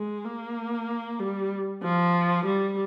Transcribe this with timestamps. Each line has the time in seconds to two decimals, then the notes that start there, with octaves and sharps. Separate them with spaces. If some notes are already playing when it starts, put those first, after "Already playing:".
Already playing: G#3
0.25 A#3
1.19 G3
1.82 F3
2.46 G3